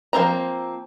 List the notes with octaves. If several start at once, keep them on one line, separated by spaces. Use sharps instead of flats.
F3 A3 A#3 C4 A#5